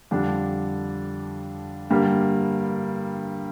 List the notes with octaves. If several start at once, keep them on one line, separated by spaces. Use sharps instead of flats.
F2 D3 G3 D4
G2 D3 G3 A#3